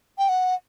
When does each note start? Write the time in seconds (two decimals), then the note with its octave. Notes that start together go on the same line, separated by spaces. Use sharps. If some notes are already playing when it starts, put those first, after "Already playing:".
0.18 G5
0.29 F#5